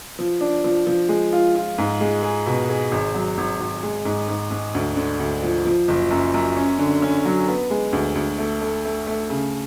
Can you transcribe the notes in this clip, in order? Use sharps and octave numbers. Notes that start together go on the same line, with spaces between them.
F3
D4
F3
F3
G#3
F4
F4
G#2
G#3
G#4
B2
G#4
G#1
F#3
G#1
G#1
G#3
G#2
G#2
G#2
D2
D3
D2
F3
F3
F#1
F#2
F#2
C#4
D3
C#4
F#3
B3
G#3
D2
D2
A3
A3
A3
A3
C#3